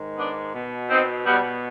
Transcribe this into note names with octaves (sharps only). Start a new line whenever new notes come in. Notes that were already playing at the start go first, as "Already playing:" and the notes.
Already playing: G#2 D#3
B3 D4
B2
C4 D#4
B2 G3 B3